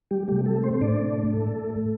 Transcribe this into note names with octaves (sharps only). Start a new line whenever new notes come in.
G3 G4
C3 G3 A3 G4
A3 A4
C4 C5
C5
A2 A3 D4 D5
A2 A3 A4